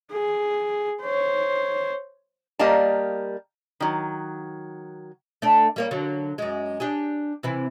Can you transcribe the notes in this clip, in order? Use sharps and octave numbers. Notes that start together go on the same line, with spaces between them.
G#4
C5 C#5
G3 A#3 A#4 D#5 F5 A5
D#3 F#3
A3 D4
G3 A#3 C#4
D3 F#3
F#2 G#3
D4 G4 G#4
C3 E3 C4